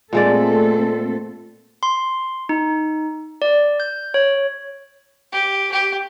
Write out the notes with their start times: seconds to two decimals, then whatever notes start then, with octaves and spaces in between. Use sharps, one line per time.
0.13 A#2 G#3 A3 C4 A4 D5
1.83 C6
2.49 D#4
3.42 D5
3.80 G6
4.14 C#5
5.32 G4
5.72 G4